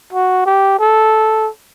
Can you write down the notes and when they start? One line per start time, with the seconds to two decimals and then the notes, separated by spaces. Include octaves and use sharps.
0.13 F#4
0.46 G4
0.80 A4